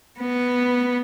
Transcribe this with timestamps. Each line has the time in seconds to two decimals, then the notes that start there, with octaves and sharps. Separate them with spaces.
0.20 B3